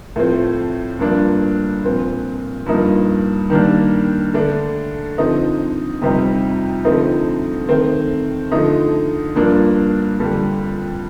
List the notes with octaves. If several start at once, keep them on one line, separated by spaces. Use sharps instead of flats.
A2 F3 A3 C4
G2 F3 A#3 D4
A#2 F3 C4
G2 F3 A#3 D#4
D#3 G3 A#3 D4
D3 A3 D4
D3 F3 C4 D#4
F2 C3 G3 C4 D#4
D3 F3 A3 C4 D#4
D#3 A3 C4
D3 F3 A3 D#4
G2 F3 A#3 D4
F2 D3 G3 D4